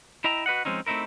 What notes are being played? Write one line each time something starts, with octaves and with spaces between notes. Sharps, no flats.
E4 D#5 E5 G5 A#5
F#4 B4 D#5 F#5
F3 G#3 C4 C#4 D#4
A3 C4 D#4 E4 A#4